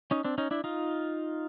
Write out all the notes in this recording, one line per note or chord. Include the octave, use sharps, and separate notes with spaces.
C#4 D#4
C4 D4
C#4 D#4
D4 E4
D#4 F4